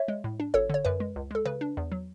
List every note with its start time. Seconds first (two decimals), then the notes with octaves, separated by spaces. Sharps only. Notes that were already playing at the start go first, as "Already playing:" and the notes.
Already playing: C#5 E5
0.08 G#3
0.24 A2
0.40 D4
0.54 G#1 A4 C#5
0.69 D3 C#5
0.85 F#2 B4
1.00 G#3
1.16 C#2
1.31 G#3 A4
1.45 C#3 B4
1.61 D4
1.77 E2
1.92 F#3